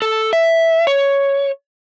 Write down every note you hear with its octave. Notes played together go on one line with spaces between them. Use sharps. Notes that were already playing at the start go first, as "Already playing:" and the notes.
A4
E5
C#5